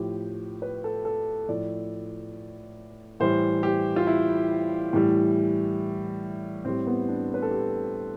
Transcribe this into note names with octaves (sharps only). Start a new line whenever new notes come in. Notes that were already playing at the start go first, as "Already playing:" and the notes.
Already playing: A2 F3 G4
B4
A4
A4
A2 F3 D5
A2 E3 G3 C5
G4
F4
E4
A2 E3 G3
A2 G3 C4
B3
D4
B4
A4
G4